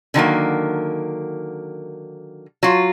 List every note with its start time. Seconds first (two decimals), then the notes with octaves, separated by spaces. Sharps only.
0.14 D3 D#3 F#3 A#3
2.63 F#3 F4